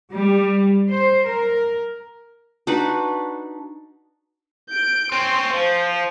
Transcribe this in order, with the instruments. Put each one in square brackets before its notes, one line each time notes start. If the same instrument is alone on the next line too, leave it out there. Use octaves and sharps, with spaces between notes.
[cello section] G3
C5
A#4
[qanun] D4 D#4 F#4 B4
[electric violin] G6 D7
[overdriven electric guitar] C4 C#4 [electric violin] C6
[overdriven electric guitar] F3 [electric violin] C5